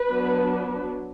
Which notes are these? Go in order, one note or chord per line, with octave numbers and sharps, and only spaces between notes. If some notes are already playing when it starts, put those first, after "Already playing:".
Already playing: B4
F#3 B3 D4